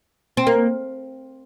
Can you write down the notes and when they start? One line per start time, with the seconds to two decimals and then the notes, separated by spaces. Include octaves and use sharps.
0.37 C4
0.47 A#3